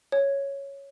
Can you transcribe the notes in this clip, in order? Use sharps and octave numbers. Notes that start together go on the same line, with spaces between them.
C#5